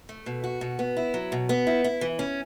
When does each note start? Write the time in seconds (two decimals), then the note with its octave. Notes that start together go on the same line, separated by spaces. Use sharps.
0.09 A3
0.26 B2
0.44 F#4
0.61 B2
0.79 B3
0.97 E4
1.14 F#3
1.32 B2
1.49 B3
1.67 E4
1.84 E4
2.01 E3
2.19 C#4